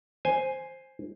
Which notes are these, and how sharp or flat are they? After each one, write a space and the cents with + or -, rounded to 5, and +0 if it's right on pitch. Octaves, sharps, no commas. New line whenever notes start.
C5 +5 G#5 +0